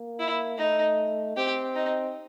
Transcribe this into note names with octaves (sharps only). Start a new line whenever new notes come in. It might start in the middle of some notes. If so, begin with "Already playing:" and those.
Already playing: A#3
E4
A3 D#4
C4 G4
D#4